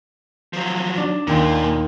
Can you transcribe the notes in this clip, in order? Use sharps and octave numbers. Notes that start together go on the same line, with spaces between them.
F3 F#3
D4
D#2 A#2 G5 C6